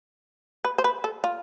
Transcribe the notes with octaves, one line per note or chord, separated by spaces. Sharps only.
B4
C5
B4
A4
F4